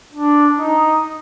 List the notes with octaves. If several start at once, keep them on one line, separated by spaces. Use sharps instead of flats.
D4
D#4